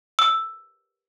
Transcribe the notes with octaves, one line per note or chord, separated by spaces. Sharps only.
E6